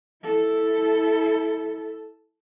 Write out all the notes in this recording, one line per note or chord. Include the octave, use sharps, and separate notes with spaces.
E4 A4